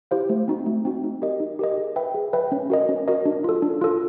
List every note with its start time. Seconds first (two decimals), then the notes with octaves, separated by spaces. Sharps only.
0.11 E4 G4 C5 F5
0.29 A3
0.48 C4 D#4 F#4
0.66 A3
0.85 C4 D#4 F#4
1.04 D#4
1.22 G4 A#4 D#5
1.40 D#4
1.59 G4 A#4 D#5
1.78 G#4
1.96 B4 E5 G5
2.14 G#4
2.33 B4 E5 G5
2.52 C#4
2.70 F#4 A#4 D#5
2.89 C#4
3.08 F#4 A#4 D#5
3.25 D4
3.44 F4 A4
3.62 D4
3.81 F4 A4